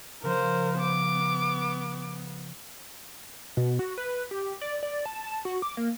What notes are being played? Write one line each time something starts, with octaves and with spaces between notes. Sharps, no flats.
C#3 F3 A#4 C5
B3 D6
B2
F#4
B4
G4
D5
D5
A5
A5
F#4
D6
A#3